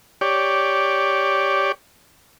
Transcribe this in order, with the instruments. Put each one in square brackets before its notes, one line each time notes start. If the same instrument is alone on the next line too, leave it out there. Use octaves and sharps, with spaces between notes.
[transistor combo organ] G4 C#5 D5